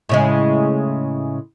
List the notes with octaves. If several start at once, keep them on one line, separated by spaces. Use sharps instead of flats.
A2 C#3 G#3